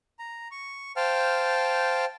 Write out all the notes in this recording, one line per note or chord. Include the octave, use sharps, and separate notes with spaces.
A#5
C#6
C5 F5 G5 A5 F6